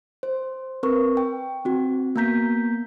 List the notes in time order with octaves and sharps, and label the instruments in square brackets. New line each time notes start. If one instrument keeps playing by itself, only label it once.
[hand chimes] C5
C4 A#4 B4 C#6
G5
C4 F#4
A#3 B3 A#5 G6 B6